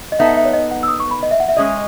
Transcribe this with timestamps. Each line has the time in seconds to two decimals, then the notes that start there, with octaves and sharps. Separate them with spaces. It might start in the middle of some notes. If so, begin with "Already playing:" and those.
0.12 D#5
0.19 B3 D#4 A4 E5
0.28 F#5
0.37 E5
0.45 C#5
0.53 D#5
0.71 F#5
0.83 E6
0.88 D#6
1.00 C#6
1.11 B5
1.23 D#5
1.31 E5
1.40 F#5
1.48 E5
1.57 G#3 C#4 G#4 D#5